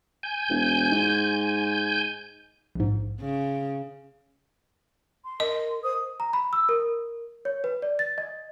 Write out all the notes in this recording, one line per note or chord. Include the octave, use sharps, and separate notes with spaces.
G#5 G6
E1
G#2
A#1 G#2
C#3
C6
A#4 D#5
C5 D#6
A#5
B5
E6
A#4
C#5
B4
D5
A6
D#5